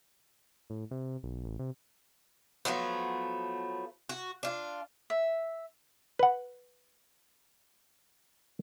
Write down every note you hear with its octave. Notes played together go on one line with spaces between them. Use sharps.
A2
C3
B1
A1
C3
F3 F#3 A3 B3
F#4
D4 F4
E5
B4 F#5